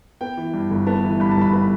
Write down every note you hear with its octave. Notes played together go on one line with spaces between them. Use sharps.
B3 G5
E3
G2
G1
B3 A5
E3
G2 B5
A5
G1 B5
B3 B5